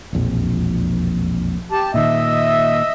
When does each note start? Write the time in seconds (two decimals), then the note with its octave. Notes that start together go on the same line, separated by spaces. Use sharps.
0.13 E1 A#1 F2
1.72 G4 A5
1.94 A#2 D#3 D#5 E5